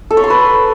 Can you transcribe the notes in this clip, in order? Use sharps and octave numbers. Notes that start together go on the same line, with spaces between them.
A4
C#5
C6
B4